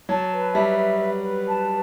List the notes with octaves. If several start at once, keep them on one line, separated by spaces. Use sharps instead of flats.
F#3 A5
B4
G3 E5
B4
B4
B4
A5